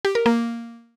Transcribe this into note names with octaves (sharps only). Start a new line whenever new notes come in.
G4
A#4
A#3